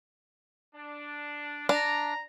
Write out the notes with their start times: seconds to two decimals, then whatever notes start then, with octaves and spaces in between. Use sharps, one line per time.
0.75 D4
1.69 D4 A#5